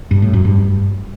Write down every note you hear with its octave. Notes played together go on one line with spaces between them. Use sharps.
G2
A2
F#2
G2